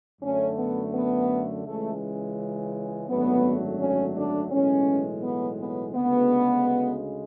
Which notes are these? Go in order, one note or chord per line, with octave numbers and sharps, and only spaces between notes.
F#2 D3 A3 C#4
B3
B3
C#2 C#3 E3 G#3 A3
G#1 F#2 D3 F#3 A3 B3
C#4
D4
B1 A2 E3 G#3 C#4
B3
B3
D2 C#3 G#3 B3